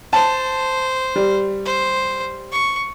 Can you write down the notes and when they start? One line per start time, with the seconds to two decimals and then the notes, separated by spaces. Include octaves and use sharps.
0.13 C5 A5
1.16 G3
1.65 C5
2.52 C#6